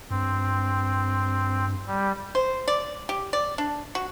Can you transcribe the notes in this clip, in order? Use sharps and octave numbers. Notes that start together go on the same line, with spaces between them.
G2 C4
G3
C5
D5
G4
D5
D4
F#4